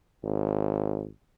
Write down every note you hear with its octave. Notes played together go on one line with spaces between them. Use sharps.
G#1